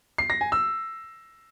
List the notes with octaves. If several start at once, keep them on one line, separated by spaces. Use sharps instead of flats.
C7
A#6
G#5
E6